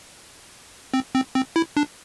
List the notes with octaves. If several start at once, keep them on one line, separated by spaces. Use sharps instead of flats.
C4
C4
C4
E4
D4